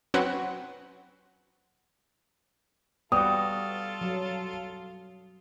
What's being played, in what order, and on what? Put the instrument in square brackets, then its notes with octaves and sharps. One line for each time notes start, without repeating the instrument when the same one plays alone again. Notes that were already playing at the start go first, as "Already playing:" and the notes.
[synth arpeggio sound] F#3 C4 C#4 F#4 B4 F#5
[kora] G3 F#4 [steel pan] B3 [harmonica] F4 A4 [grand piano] D#6
[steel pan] F#3